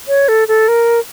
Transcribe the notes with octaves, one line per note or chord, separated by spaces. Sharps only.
C#5
A4
A4
A#4